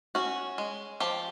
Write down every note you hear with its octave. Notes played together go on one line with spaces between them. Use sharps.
C#4 F#4
G#3
F3 G4